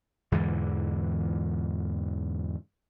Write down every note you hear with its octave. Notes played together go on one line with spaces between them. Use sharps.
E2 G#2 D3 E3